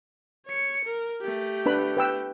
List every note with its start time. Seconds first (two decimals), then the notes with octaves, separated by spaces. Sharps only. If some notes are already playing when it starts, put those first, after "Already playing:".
0.46 C#5 C#7
0.85 A#4
1.21 A3 G4
1.66 D4 B4 B5
1.97 B4 G5 E6